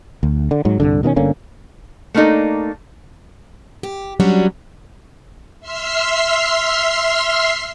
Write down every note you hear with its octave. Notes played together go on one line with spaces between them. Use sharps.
D2
D3
G#2 F#3
C2 G2 D3
B2 D#3 A3 C#4
G1 D3 A#3 C#4
A3 A#3 D4 D#4 A4
G4
F#3 G3 C#4 D4 F#4
E5 C6 E6 F6 C7